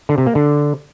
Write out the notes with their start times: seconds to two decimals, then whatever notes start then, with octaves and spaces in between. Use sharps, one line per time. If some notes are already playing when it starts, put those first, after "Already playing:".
0.09 D3
0.18 C3
0.27 A#3
0.35 D3